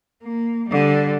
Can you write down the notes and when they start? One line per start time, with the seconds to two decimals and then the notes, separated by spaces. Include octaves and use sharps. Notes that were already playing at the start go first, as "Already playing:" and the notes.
0.23 A#3
0.69 D3 G3